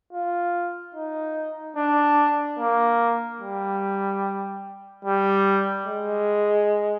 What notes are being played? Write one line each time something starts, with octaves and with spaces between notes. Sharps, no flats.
F4
D#4
D4
A#3
G3
G3
G#3